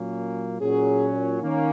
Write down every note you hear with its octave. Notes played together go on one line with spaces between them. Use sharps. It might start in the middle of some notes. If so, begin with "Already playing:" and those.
Already playing: A#2 F#3 A#3 C#4
A#2 F#3 C#4 G#4
D#3 A#3 C#4